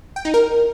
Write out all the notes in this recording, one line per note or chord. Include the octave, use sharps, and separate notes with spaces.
G5
D#4
A#4